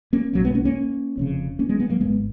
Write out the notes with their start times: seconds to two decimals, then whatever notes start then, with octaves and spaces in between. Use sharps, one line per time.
0.13 A#3 C#4
0.33 B1 B2 F#3 A#3
0.45 G#3 B3
0.55 A#3 C#4
0.65 A#3 C#4
1.17 F1 F2 C#3
1.59 A#3 C#4
1.69 G#3 B3
1.80 G#3 B3
1.90 F#3 A#3
2.00 G#1 G#2 G#3 B3